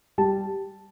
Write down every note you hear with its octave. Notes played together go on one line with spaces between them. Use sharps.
G3 A5